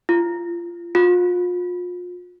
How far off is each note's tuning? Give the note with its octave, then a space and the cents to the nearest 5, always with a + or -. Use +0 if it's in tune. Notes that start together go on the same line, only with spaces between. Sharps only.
F4 -25
F4 +35